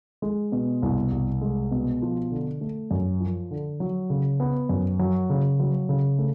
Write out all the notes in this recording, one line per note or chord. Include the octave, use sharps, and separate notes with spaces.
G#3
B2
C2
C2
G#3
B2
F3
D3
A3
F#2
F3
D3
F#3
C#3
B3
F#2
F#3
C#3
F#3
C#3
A3